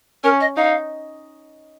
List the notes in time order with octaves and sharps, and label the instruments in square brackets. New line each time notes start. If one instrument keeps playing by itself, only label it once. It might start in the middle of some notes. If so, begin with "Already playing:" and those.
[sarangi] C#4 [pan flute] A#4
[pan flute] D#5
[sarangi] D#4 [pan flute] F5